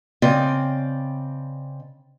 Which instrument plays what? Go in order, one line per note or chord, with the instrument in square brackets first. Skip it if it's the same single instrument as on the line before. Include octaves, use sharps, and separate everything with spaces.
[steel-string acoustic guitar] C#3 C4 D5 D#5